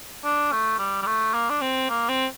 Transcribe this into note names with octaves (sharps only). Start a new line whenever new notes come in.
D4
A3
G3
G3
A3
A#3
D4
C4
A#3
C4